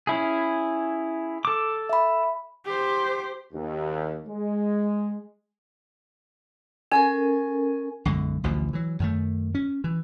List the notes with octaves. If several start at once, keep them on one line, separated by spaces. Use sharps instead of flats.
C#4 E4 G#4
A4 D6
E5 B5
G4 C5
D#2
G#3
C#4 A4 A#4 G#5
B1 F#2 D3 G#3
A1 D2 B2 F3
E3 F#3
F#2 D#3 A3
C#4
E3